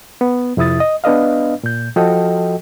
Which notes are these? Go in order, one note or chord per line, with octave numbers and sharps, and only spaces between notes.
B3
F2 C3 E4 D#6 A6
D#5
B3 D4 B4 D#5 F5
A#2 G6
F3 F#4 A4 D#5 G5